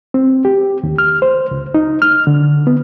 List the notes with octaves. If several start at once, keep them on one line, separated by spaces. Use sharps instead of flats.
C4
G4
D#2
F6
C5
C#2
D#4
F6
D3
B3